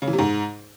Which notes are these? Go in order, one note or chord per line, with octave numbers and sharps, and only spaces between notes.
C#3
E3
C3
G#2